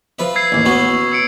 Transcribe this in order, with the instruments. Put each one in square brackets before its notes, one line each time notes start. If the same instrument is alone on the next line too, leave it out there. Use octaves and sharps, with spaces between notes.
[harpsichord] F3 B4 E5
[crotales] E6 G#6 C7
[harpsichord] A1 D#2 [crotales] C7
[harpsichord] B3 C#4 F#4
[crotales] E6 C#7 D7